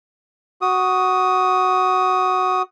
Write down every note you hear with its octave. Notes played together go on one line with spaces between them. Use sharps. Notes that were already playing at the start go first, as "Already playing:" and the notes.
F#4 D#6